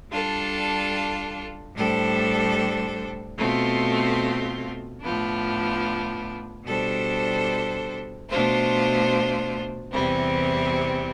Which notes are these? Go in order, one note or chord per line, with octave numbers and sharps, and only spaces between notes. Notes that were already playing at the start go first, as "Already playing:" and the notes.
G3 D4 F4 A4
A2 G3 D4 A4 C5
B2 A3 C4 F4
A2 F3 B3 D4
B2 G3 D4 A4 C5
B2 A3 D4 F4 C5
E2 C3 E3 G3 C4